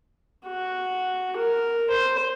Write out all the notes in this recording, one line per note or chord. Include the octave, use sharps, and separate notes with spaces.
F#4
A#4
C5